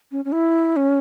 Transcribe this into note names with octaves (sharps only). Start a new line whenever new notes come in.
C#4
C#4
E4
C#4